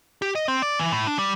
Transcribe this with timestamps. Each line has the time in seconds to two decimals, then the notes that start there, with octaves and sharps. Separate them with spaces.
0.22 G4
0.35 D#5
0.48 C4
0.62 D5
0.79 E3
0.92 A2
1.07 D4
1.19 G3